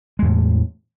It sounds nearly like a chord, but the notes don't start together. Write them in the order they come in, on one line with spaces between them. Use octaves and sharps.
G#3 E2 A2